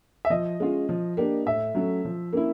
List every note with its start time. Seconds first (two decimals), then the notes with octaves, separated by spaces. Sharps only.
0.25 E5
0.30 F3 D#5
0.60 G#3 C#4 F4
0.89 F3
1.17 A#3 D4 G4
1.46 A2 E5
1.75 F#3 A3 C#4
2.05 F3
2.33 A#3 C#4 E4